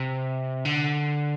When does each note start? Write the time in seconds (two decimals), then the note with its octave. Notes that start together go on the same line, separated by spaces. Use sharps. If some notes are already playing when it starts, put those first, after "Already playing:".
Already playing: C3
0.65 D3